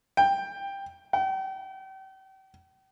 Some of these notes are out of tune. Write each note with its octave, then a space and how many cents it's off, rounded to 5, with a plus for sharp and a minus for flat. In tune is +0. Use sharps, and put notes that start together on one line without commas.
G5 +10
G5 -40